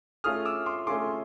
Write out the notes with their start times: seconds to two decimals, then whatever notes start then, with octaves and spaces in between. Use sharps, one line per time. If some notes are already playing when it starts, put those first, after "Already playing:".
0.24 A3 C#4 F4 G#4 D#6 F6
0.45 D6 E6
0.66 C6 D6
0.87 A3 C#4 F4 G#4 C6 D6